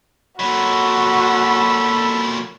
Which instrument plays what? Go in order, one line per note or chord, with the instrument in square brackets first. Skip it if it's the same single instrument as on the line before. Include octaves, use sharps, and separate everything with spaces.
[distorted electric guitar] A#2 F#3 [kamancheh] F#4 [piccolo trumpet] A4 [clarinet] B5